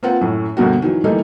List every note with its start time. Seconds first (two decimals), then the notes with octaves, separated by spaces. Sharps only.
0.03 A#3 C4 F4 B4 F#5
0.21 F#2 A2
0.57 D2 G2 B2 A#3 F#4
0.82 D#3 E3 F#3
1.04 D#3 E3 G3 A3 A#3 D#4